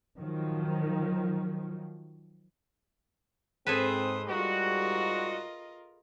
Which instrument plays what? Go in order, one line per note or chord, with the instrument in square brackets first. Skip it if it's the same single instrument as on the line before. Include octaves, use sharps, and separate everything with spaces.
[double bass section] D#3 F3 F#3
[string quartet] G#2 C5 D#6 [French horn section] C4 [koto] G#4 A4 B4
[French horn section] G#2 G3 [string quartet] F4 A#4 D#5 [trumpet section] F#4